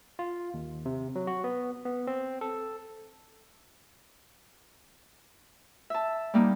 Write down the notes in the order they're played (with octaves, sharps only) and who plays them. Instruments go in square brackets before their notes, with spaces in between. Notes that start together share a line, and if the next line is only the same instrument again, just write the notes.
[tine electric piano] F4
D#2
C3
F#3
F#4
B3
B3
C4
A4
[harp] E5 A5
G3 A#3 D#4